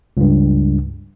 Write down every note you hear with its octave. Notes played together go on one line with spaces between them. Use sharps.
C#2 G2